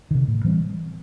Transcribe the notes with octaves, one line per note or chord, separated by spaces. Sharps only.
C3 D#3
A2
E3 G3 C4